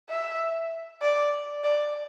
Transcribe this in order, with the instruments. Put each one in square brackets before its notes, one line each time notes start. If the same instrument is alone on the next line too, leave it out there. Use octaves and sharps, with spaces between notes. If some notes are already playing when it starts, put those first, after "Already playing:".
[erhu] E5
D5
D5